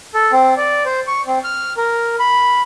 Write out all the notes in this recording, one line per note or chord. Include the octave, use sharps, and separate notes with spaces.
A4
C4
D5
C5
C#6
C4
F6
A#4
B5